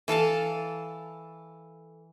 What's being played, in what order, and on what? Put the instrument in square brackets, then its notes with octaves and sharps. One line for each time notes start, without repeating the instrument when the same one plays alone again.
[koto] E3 A4 F5 A5